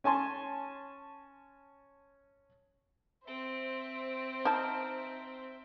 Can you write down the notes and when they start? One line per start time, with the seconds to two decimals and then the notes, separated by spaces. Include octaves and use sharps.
0.04 C#4 G#5 A5 C6
3.27 C4 C5 E5
4.45 D#4 A5 A#5 F6 G6